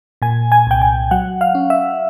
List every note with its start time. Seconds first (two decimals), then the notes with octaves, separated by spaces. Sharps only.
0.22 A#2 G#5
0.52 G#5
0.67 C2 G5
0.82 G#5
1.11 F#3 F#5
1.41 F5
1.55 C#4
1.70 E5